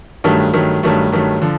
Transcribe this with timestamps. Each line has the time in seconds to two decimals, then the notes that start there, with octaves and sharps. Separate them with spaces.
0.24 G2 D#3 F#3 A3
0.53 G2 D#3 F#3 A3
0.83 G2 D#3 F#3 A3
1.12 G2 D#3 F#3 A3
1.42 D3 F3